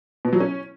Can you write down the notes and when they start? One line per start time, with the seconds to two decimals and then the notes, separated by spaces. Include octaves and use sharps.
0.25 B2
0.33 F#3
0.40 C#4